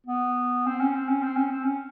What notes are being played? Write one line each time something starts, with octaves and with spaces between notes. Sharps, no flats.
B3
C4
C#4
C4
C#4
C4
C#4
C4
C#4